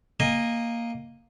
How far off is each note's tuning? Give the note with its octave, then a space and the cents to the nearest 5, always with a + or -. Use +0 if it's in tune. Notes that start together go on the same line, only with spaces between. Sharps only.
A#3 +0 D#5 +0 G#5 -30